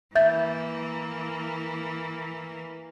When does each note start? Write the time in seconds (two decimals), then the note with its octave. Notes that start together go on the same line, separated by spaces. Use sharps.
0.15 E3 A#3 E5 G6 A6